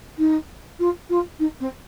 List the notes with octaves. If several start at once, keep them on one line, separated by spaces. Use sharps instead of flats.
D#4
F4
F4
D#4
C4